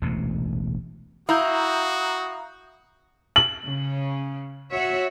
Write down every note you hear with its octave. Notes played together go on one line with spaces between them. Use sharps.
E1 A1 D2 C3
E4 F#4 F5 A#5 D#6 G6
F#7
C#3
F#4 C#5 E5